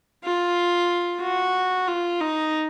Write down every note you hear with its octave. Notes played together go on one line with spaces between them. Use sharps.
F4
F#4
F4
D#4